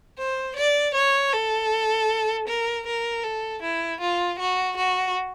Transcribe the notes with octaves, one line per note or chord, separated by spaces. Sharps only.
C5
D5
C#5
A4
A#4
A#4
A4
E4
F4
F#4
F#4